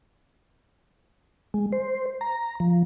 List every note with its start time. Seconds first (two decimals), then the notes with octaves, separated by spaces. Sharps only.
1.54 G#3
1.72 C5
2.21 A#5
2.60 F3